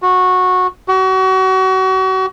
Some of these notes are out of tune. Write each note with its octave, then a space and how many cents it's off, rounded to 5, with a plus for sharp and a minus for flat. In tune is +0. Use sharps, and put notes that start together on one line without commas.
F#4 -15
F#4 +35